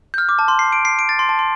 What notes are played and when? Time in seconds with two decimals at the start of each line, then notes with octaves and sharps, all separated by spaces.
0.14 G6
0.18 F6
0.29 D6
0.39 A5
0.48 C6
0.59 C7
0.73 D7
0.85 C7
0.99 D7
1.09 A6
1.19 C6
1.29 A5
1.39 C6